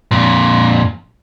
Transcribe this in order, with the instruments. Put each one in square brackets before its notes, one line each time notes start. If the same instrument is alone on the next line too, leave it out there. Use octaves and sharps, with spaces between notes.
[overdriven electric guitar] F2 A#2